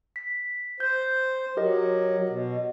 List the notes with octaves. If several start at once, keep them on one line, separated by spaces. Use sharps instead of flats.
B6
C5 G6
F#3 G4 A#4 D#5
B2